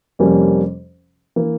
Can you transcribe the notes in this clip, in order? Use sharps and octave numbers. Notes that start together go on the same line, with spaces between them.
F2 C3 G3 A#3 C#4
E3 A#3 E4